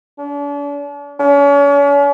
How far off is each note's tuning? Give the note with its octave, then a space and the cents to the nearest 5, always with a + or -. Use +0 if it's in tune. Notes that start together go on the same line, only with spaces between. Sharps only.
D4 -40
C#4 +40